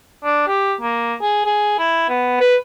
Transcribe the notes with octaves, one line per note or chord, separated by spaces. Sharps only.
D4
G4
A#3
G#4
G#4
E4
B3
B4